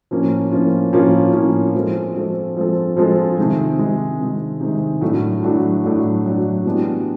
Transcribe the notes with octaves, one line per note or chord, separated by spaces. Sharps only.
A2 F3 A#3 C#4 F4
A2 F3 A#3 C#4 F4
A2 F3 A#3 C#4 F4
A2 F3 A#3 C#4 F4
F3 G#3 C4 F4 A4
F3 G#3 C4 F4 A4
F3 G#3 C4 F4 A4
F3 G#3 C4 F4 A4
C3 D#3 G#3
C3 D#3 G#3
C3 D#3 G#3
C3 D#3 G#3
A2 F#3 A3 D4 F#4
A2 F#3 A3 D4 F#4
A2 F#3 A3 D4 F#4
A2 F#3 A3 D4 F#4
E3 G#3 B3 D4 G4